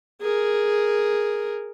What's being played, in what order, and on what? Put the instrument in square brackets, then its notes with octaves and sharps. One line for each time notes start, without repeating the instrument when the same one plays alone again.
[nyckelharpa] G#4 A#4